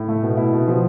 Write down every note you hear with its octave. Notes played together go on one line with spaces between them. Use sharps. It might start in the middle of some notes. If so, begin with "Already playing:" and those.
Already playing: A2
A3
B2
E4
B2
F3